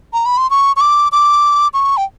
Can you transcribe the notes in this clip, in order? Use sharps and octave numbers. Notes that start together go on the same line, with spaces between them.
A#5
B5
C6
C#6
C#6
D6
D6
C#6
G5